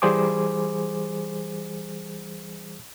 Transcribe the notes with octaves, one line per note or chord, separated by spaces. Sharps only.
E3 G3 G#4 C5 G#5 D6